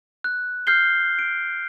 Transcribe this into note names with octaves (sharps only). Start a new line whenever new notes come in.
F#6
F6 G6 C7 G7
D7